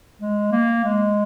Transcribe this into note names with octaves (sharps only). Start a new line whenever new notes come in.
G#3
A#3
G#3